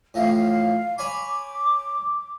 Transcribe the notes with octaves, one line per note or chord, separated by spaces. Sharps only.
A2 E3 F3 F5
C#5 G#5 B5 D6